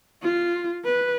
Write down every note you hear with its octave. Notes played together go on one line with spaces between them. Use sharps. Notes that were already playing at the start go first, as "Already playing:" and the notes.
F4
B4